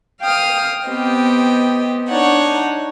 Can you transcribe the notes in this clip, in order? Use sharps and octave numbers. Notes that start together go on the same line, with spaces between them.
F5 G5 D#6 F6
B3 C4 G4 D#5
D4 D#4 C#5 F#5